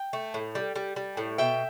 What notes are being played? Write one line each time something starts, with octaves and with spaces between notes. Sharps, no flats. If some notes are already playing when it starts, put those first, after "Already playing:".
Already playing: G5
A3
A2
G3
G3
G3
A2
B2 E5 G5